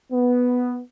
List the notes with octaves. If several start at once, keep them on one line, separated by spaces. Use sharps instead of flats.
B3